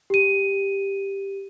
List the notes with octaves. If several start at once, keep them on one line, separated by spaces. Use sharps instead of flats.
G4 D#7